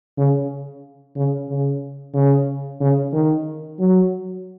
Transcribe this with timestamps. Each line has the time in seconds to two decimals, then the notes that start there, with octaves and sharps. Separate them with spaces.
0.18 C#3
1.16 C#3
1.49 C#3
2.14 C#3
2.81 C#3
3.13 D#3
3.79 F#3